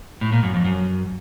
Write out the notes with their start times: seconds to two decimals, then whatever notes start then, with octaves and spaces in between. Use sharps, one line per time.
0.21 A2
0.32 A#2
0.43 F#2
0.54 F2
0.65 F#2